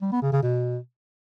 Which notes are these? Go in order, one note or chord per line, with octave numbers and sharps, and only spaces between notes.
G3
B3
C#3
C#3
B2